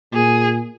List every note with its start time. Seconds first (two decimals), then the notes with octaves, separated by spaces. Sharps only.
0.13 A#2 G#4